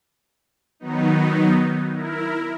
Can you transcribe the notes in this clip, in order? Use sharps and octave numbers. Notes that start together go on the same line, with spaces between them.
D#3 F#3 B3 D#4
E4 A#4